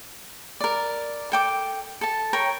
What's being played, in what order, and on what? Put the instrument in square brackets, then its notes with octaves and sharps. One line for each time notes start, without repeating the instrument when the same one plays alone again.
[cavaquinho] A#4 D5
A4 G5 D6
A4 A5
A#4 C#5 G5